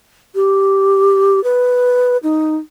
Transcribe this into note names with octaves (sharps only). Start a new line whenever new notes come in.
G4
B4
D#4